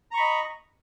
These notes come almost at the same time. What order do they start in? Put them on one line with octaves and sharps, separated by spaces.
A#5 C#6 B5 D#5